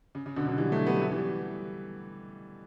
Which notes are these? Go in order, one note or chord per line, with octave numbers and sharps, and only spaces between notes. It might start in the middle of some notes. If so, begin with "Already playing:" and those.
C#3
C#3
B2 D3
D3 F#3
E3 G3
F#3 A3
G3 B3
F#3 A3
E3 G3